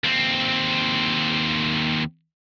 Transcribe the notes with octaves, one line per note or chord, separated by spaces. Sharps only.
D#2 C4